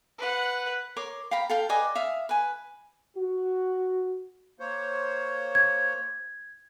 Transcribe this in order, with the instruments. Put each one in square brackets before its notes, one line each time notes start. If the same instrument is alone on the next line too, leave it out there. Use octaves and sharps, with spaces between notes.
[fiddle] B4 F#5
[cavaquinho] A#4 C#5 C6 D6
F5 G5 A#5 B5
A4 F5 G5
B4 D5 D#5 G#5
E5 F5 D#6
B4 G#5
[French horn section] F#4
[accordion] A#3 C5 C#5
[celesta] G#6